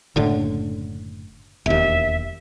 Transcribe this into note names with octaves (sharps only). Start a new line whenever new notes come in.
F#1 A2 D3
E1 D#2 E5